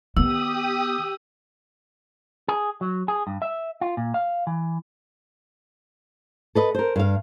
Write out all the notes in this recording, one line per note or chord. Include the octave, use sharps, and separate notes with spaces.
D#3 B3 G4 D#6 E6
G#4
F#3
G#4
G2
E5
F4
A#2
F5
E3
A4 B4 D#5
A#4 C5
G2 F5